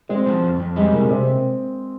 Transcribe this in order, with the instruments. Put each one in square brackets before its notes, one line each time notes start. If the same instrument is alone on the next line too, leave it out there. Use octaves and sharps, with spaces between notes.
[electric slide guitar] G#3 [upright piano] C4
[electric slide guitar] F3
F2
F2
[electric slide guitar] G3 [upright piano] G#3
[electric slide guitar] C3 [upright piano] A#3
[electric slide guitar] C3 [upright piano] C4